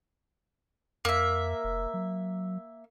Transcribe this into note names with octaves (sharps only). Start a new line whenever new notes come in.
F2 A#3 E5
F1
F#3